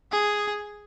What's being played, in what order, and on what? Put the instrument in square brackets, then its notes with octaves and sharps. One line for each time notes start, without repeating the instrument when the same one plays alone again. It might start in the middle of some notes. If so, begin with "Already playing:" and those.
[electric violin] G#4